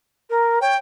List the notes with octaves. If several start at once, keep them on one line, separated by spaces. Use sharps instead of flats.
A#4
C#5 G5